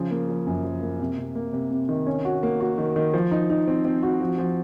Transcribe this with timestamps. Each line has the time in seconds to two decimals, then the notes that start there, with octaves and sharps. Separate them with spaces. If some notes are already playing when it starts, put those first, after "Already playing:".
Already playing: C#3 F3
0.11 A#3
0.29 F3
0.47 F#2
0.64 F3
0.82 A#3
1.00 C3
1.18 C3
1.35 A#3
1.53 C3
1.71 C3
1.89 D#3
2.07 C#4
2.25 F#4
2.43 A#3
2.60 F#4
2.78 D#3
2.96 D#3
3.14 F3
3.31 D#4
3.50 D#4
3.68 C4
3.85 C4
4.03 F#4
4.21 F3
4.38 F3